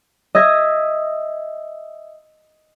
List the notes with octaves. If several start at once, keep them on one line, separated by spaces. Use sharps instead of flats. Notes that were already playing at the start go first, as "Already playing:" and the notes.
D#5 E5 G#6 A#6